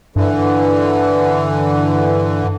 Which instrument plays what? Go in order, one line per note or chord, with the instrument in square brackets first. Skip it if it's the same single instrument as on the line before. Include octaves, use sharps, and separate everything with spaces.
[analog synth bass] G2 [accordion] D3 E3